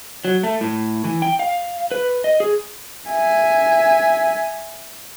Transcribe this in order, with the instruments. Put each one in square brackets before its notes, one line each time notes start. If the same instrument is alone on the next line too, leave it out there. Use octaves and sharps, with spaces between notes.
[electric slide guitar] F#3
A3
A2
E3
G5
F5
B4
D#5
G#4
[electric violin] E5 G#5